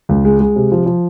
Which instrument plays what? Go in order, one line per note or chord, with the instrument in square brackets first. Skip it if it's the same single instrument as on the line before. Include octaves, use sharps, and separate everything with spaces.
[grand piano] C#2
G#3
G#3
C3
F3
F3